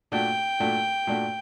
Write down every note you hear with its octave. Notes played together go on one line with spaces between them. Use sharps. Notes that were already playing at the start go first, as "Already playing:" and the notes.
A#2 A3 D4 F#4 G5
A#2 A3 D4 F#4
A#2 A3 D4 F#4